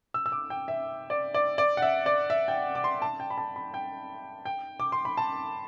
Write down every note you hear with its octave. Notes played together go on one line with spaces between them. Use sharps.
E6
E6
D6
G5
E5
D5
D5
D5
F#5
E5
D5
E5
G5
D6
C6
A5
G5
B5
A5
B5
G5
G5
D6
C6
B5
A5